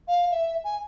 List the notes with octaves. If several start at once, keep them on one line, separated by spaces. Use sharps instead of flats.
F5
E5
G#5